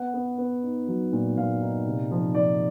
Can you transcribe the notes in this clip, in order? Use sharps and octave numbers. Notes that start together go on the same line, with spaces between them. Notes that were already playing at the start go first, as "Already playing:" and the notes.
Already playing: B3 F#5
B3
B3
D#4
F#3
A#2
A#2 F5
D#4
C3
F3
F3 D5